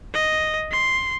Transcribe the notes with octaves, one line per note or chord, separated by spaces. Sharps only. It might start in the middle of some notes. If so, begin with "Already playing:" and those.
D#5
C6